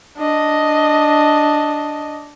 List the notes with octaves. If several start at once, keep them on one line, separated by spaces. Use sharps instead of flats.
D4 D#5